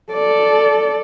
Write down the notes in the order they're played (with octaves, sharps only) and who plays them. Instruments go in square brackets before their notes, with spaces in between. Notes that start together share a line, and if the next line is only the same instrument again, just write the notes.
[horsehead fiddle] A4 D5